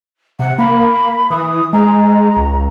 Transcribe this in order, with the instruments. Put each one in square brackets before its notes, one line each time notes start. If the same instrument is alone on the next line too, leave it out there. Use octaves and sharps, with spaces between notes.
[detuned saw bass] C3 [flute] F#5
[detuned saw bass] A#3 [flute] B5
[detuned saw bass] E3 [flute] D#6
[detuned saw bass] G#3 [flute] A#5
[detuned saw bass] C#2